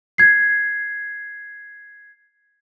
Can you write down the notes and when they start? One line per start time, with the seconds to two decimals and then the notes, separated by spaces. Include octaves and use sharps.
0.18 G#6 C7